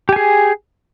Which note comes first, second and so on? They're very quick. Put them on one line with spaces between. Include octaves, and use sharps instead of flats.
G4 G#5 G#4